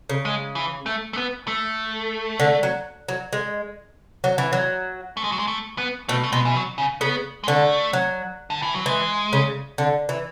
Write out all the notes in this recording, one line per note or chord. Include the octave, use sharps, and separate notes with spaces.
C#3
G#3
E3
A3
A3
B3
A3
D3
F#3
F#3
G#3
F#3
E3
F#3
A3
G#3
F#3
G#3
A3
B3
B2 A3
A3
B2 G#3
E3
F#3
C#3
C#3 B3
G#3
D3 A3
F#3
D3
E3
F#3
E3 G#3
C#3
D3
E3